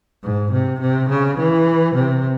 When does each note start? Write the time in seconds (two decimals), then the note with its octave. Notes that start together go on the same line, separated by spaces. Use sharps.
0.24 G#2
0.52 C3
0.81 C3
1.10 C#3
1.38 E3
1.95 C3